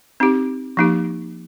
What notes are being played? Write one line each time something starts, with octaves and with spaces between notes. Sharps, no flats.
C4 D#4 G4
F3 A#3 D#4 G4